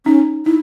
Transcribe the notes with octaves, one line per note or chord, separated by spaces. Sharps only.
C#4 D#4
D#4 E4